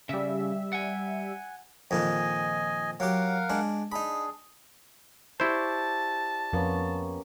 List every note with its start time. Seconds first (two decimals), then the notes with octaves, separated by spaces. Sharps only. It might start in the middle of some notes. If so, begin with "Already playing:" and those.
0.09 C#3 G3 E5
0.73 F#5 G#5
1.91 F2 A#2 D#3 D#5 G#5
3.00 F#3 G4 A#4 F5 F#5
3.50 G#3 D4
3.92 D4 D#4 G#4 B5
5.40 E4 G4 C5 D5 A5 C#6
6.53 F2 A#3 B3 C#4